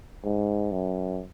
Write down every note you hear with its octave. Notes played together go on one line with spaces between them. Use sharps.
G#2
F#2